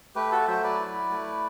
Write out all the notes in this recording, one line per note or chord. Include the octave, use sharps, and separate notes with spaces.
A3 G4 B4
F#4 A4
F#3 C5 E5
B4 D5
E4
A3